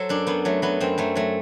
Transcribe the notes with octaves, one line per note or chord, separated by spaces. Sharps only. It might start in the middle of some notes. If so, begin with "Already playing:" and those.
Already playing: F#3 A4 C5
F#2 D4
F#2 B3
F#3 A3
F#3 B3
F#2 C4
F#2 A3
F#3 A3